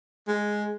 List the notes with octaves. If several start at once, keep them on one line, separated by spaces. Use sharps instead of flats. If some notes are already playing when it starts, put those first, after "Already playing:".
G#3